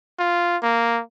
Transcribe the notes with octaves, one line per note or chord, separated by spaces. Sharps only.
F4
A#3